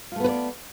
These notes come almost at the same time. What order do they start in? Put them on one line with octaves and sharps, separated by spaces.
F4 A3 B3 B4 D5